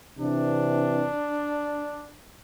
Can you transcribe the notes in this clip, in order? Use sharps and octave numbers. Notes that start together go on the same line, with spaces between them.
C3 E3 D4